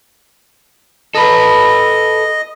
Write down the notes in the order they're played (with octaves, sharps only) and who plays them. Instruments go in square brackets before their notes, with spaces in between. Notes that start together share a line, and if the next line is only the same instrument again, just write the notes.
[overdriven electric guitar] A4 B4 [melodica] D#5